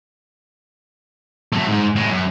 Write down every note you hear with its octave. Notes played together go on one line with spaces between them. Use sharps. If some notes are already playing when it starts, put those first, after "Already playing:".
F#3 A3
G#2
A2 G#3
F#2